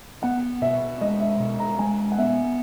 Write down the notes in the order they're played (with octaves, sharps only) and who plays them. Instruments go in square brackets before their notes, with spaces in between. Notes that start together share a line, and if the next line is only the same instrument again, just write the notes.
[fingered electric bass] B3 [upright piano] F#5
[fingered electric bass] B2 [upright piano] E5
[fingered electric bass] G#3 [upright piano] D#5
[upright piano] E5
[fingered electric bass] B2
[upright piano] A#5
[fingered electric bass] G#3 [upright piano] G#5
[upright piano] F#5
[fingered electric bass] B3 [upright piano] E5